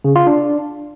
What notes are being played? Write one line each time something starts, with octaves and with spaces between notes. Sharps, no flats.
C#3
F4
D4